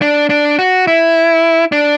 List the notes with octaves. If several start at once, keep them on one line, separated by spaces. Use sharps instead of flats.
D4
D4
F#4
E4
D4